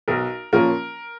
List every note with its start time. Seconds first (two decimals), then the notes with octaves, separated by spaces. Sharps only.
0.08 B1 A#4
0.53 A#2 F3 A#3 C#4 A#4